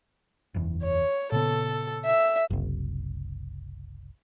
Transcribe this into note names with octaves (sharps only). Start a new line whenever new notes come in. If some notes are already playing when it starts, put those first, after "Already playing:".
F#1 E2
C#5
A#2 C#3 B3 A4
E5
F#1 C2